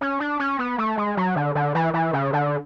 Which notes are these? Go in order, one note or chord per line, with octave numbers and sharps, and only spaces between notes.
C#4
D4
C#4
B3
A3
G#3
F#3
D3
D3
E3
E3
C#3
D3